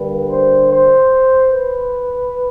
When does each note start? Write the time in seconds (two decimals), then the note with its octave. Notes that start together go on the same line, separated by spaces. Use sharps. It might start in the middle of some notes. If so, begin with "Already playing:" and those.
Already playing: G2 D3 G3 A#3 B4
0.27 C5
0.69 C5
1.49 B4